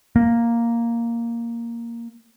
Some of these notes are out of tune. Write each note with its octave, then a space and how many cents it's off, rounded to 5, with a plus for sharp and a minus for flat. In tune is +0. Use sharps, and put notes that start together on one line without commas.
A#3 +0